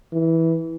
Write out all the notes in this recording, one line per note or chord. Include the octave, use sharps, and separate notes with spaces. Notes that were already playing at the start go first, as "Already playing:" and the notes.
E3